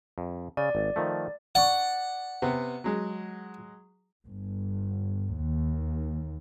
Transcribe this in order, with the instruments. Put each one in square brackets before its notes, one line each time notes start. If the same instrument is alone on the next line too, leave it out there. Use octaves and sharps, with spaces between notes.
[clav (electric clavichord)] F2
[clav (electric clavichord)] C#3 [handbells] D5
[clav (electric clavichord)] G#1
D#3 F3 A3
[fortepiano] D5 C#6 [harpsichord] F#5
[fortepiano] C3 B3
F#3 G#3
[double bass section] G1
D#2